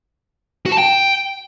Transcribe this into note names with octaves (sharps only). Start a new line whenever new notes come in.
F#4
A5
G5